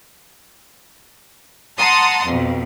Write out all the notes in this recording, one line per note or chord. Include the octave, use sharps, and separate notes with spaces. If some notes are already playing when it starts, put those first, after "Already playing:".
F#5 A5 A#5 C6 D#6
F2 B2